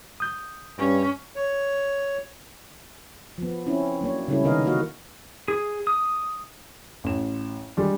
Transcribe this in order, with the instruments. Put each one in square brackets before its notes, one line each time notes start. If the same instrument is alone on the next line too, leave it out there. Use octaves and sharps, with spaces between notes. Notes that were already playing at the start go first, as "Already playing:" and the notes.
[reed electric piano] D#6 G6
[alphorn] G2 [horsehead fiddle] C#4
[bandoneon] C#5
[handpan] F3 B3
C4 C#4 E4
F#3 A#3 D4 C#5
C#3 G3 G#3 C#4 E4 A4
C3 D#3 B3 A#4 D#5 F5
E3 A#3 F#4 D#5 F5
[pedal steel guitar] G#4
D#6
[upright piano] A1 E7
G3 G#3 D4